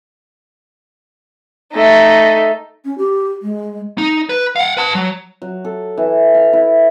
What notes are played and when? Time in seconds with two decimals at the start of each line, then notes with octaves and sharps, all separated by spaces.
1.73 A3 D#4
2.85 C#4
2.98 G4
3.42 G#3
3.98 D#4
4.29 B4
4.56 F5 F#5
4.77 B4 A5
4.95 F#3
5.42 F#3
5.65 A4
5.98 E3
6.34 F5
6.53 E4